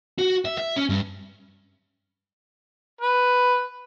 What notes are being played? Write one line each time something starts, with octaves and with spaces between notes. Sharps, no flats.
F#4
E5
E5
C#4
G2
B4